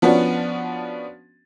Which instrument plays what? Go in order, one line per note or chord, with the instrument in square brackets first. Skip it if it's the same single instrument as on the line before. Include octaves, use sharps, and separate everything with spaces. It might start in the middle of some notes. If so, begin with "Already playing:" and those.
[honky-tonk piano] F3 B3 C#4 D4 F#4